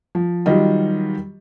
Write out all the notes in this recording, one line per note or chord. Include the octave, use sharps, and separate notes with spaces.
F3
D#3 F#3 G3 F4 D#5